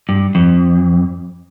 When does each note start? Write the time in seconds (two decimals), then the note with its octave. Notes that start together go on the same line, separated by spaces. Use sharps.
0.09 G2
0.35 F2